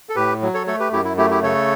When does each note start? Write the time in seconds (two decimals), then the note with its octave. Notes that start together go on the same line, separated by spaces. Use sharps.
0.09 A4
0.16 A2 G4 B4
0.42 F#3
0.54 A4 C#5
0.67 A3 A4 C#5
0.80 G4 B4
0.93 F#2 E4 G4
1.05 E4
1.17 A3 E4 G4
1.31 E4 G4
1.43 C#3 A4 C#5